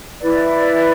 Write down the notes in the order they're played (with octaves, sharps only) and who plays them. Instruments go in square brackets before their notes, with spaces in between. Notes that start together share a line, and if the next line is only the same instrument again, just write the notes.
[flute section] E4 B4 D5